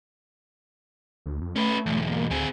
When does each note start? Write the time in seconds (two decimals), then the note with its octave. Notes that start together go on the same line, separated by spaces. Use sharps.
1.26 D2
1.41 F2
1.56 A3 C#4 B4
1.86 B1 E2
2.09 A#3
2.31 D2 C4 G#4